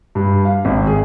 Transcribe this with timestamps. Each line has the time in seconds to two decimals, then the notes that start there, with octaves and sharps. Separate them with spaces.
0.15 G2
0.45 F5
0.65 G#1
0.87 G#4